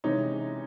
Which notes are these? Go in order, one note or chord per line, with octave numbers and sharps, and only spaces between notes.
C3 E3 G#3 C#4 D#4